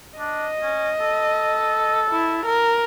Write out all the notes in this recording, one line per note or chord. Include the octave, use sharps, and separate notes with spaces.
D4 D#5
C#4
A4
E4
A#4